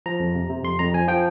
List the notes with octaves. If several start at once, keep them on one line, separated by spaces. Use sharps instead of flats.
F3 A#5
F2
C3
C3
F2 C6
F2 A#5
F3 G#5
F3 G5